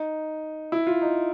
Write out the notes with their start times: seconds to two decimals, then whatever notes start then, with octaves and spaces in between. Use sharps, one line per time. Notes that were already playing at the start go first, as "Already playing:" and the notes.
Already playing: D#4
0.72 E4
0.87 F4
1.02 D#4